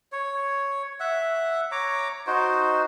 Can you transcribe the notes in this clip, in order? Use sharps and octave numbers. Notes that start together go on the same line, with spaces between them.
C#5
E5 F#5
C#5 A#5 D6
D#4 F#4 C5